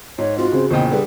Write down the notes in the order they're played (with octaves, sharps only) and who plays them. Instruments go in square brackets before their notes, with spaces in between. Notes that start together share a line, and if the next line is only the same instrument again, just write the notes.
[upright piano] G#2 [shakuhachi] C#5
[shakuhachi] C4 [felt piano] F4 [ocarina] F#4
[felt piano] C#3 [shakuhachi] C4
[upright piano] E2 A#2 C#3 [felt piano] C5 G5 [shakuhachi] D#5
[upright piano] D3 G3 [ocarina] G#4 [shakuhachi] B4